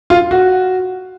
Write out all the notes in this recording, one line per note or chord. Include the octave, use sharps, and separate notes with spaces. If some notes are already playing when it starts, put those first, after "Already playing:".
F4
F#4